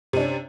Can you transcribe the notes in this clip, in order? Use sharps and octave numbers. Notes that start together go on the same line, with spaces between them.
C3 C#4 D4